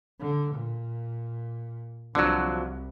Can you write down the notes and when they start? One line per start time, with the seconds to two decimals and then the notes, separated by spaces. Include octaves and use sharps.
0.20 D3
0.55 A#2
2.15 C2 D3 F3 F#3 D4 F#4